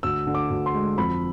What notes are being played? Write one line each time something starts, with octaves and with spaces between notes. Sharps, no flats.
D2 E6
D3
D6
D2
C6
G#3
F2 B5